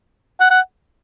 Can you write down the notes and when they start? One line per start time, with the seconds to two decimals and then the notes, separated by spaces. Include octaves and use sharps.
0.40 F#5
0.51 F#5